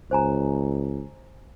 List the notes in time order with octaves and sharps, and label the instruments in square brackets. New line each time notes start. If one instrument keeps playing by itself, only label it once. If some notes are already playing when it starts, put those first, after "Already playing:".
[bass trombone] C#2 [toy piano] C5 G#5 A#5